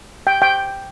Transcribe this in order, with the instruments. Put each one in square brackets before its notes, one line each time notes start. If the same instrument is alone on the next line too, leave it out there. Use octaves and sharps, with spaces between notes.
[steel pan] G5
G5